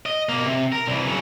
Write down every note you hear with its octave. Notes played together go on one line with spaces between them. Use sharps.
D#5
B2 A#3
C3
A#4
C2 E3
C#3 F#3